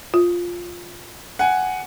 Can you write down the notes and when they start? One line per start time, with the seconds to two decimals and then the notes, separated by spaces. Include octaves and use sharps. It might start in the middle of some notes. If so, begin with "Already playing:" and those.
0.14 F4
1.39 F#5 G#5